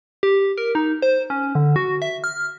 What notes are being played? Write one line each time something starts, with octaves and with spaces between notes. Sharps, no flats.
G4
A#4
D#4
C5
C#4
D3
F#4
E5
F6